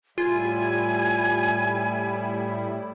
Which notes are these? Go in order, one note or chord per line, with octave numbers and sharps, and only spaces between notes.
A2 G3 E4 F4 G#5